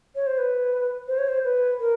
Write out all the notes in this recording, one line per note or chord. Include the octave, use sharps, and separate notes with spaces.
C#5
C5
B4
C5
C#5
C5
B4
A#4